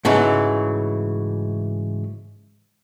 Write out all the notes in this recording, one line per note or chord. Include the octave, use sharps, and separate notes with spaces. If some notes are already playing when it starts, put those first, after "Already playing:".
G#2 C#3 E3 F#3 A3